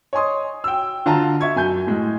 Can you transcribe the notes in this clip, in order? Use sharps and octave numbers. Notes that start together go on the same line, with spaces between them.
C#5 D#5 G#5 C6 D#6
G5 E6
D3 F4 A5 A#5
E5 C#6 G#6
F#2 G#5 G6
A2 G#3